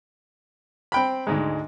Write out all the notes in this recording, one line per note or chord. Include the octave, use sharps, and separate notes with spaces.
C4 G5 B5
D2 G#2 G#3